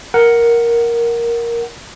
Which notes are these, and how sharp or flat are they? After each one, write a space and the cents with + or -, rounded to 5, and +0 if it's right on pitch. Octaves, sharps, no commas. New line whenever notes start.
A#4 +5 F#5 +0